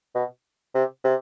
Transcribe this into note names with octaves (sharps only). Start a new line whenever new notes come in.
B2
C3
C3